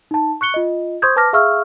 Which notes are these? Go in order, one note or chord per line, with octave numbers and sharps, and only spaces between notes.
D#4 A5
C#6 F#6 C#7 G7
F4 D#5
C5 C6 C#6 D#6 G6 G#6
B4 A5 D6 F6 A#6
G#4 E5 F5 C#6 E6 F6